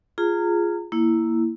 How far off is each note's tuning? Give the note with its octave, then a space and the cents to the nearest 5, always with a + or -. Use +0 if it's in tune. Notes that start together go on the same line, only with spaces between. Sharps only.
F4 -5 G#4 +0 A#5 -30
A#3 -5 E4 +0